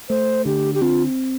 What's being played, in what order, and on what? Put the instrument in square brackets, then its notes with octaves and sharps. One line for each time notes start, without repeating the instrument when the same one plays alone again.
[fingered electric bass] A3 [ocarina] C5
[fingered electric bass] D3 [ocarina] G4
[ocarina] G4
[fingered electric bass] C4 [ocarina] F4